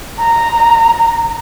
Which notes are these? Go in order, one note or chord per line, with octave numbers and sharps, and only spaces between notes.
A#5